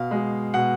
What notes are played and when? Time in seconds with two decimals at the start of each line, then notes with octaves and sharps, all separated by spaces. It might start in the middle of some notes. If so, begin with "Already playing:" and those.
Already playing: B2 F5
0.11 G#3
0.54 B2 F#5